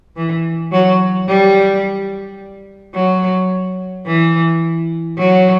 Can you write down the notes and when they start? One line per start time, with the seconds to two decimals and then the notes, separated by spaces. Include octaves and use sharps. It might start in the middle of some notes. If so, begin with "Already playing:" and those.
0.16 E3
0.72 F#3
1.28 G3
2.95 F#3
4.06 E3
5.18 F#3